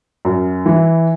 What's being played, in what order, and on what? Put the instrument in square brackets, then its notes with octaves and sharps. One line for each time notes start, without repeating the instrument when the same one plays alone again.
[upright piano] F#2
E3